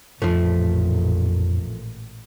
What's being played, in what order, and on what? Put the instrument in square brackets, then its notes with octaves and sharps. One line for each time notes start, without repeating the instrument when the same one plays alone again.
[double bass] A1 A#2 [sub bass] F2 [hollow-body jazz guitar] F3 A3